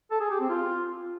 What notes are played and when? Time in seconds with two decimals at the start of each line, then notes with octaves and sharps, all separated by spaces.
0.11 A4
0.21 G#4
0.30 G4
0.40 C4
0.50 F4